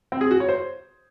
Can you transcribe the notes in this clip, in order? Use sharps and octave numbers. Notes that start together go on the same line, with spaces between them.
C4
G#4
F#4
C#5
C5